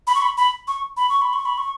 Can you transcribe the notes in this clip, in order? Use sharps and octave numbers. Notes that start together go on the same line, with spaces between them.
B5
C#6
B5
B5
C#6
B5
C#6
B5
C#6
B5
C#6